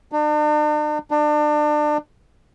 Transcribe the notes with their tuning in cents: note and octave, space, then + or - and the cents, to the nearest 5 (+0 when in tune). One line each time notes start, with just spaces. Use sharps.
D4 +45
D4 +30